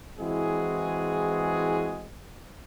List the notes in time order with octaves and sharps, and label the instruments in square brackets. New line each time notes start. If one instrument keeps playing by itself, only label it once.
[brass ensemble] E3 G#3 C4 E4 F#4 G#4